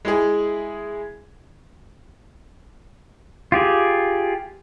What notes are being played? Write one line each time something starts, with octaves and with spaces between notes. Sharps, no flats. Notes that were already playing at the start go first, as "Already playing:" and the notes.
G#3 E4 G#4
F4 G4 G#4